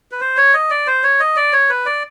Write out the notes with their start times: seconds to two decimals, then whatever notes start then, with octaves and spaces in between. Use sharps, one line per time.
0.12 B4
0.20 C5
0.37 C#5
0.54 D#5
0.70 D5
0.87 C5
1.04 C#5
1.20 D#5
1.36 D5
1.53 C#5
1.69 B4
1.86 D5